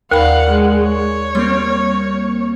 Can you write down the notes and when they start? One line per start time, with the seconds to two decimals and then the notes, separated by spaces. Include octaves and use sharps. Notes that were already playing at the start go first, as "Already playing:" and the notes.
0.11 D#2 A#4 D5 F5 F#5 B5
0.51 G#3
0.83 C#5
1.35 G3 A#3 C4 C6